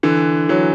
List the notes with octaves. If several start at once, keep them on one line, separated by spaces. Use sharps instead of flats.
D3 E3
E3 F#3